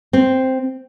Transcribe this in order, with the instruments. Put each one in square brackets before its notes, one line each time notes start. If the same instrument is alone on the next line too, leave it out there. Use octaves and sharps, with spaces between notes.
[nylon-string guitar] C4